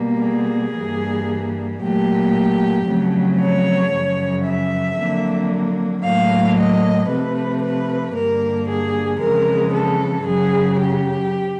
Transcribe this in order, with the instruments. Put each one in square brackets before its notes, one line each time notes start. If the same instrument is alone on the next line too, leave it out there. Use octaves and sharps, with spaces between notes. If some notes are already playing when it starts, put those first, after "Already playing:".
Already playing: [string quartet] B2 G3 A#3
G#4
G2 E3 G3 A#3
A#2 F#3 A3 G4
F2 C#3 F#3 A3
C#5
F#2 C#3 F3
E5
F2 D3 F#3 A#3
A2 F#3 A#3 F5
D#5
C3 F3 A3 B4
B4
G2 D3 G3 A#3 A#4
G#4
F2 C#3 E3 G#3 A#4
A4
F#2 C#3 F#3 G#4
G4